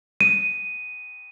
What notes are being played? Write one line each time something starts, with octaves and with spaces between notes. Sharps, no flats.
D#7